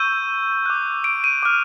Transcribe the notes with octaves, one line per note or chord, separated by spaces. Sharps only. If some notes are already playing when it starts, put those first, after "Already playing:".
Already playing: C#6 E6 G6 D#7
D6 F#6
D7
D#7
D6 F6